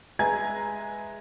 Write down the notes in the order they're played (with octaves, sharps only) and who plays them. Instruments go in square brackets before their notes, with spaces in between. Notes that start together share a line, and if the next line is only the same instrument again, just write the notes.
[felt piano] G#3 B4 E5 G#5 A#5 G#6